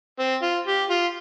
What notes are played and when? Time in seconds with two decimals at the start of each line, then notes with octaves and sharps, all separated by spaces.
0.19 C4
0.42 F4
0.67 G4
0.90 F4